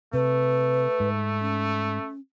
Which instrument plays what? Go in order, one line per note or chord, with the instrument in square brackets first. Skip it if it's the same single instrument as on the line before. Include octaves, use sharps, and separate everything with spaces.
[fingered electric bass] C3 [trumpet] A3 [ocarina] B4
[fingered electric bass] G#2
[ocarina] C#4